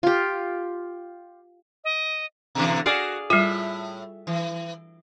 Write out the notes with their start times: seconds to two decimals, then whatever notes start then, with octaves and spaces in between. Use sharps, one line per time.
0.03 F4 G4
1.84 D#5
2.55 B2 D3 E3
2.86 F#4 G#4 D5 F5
3.30 A2 G3 F4 E5
4.27 E3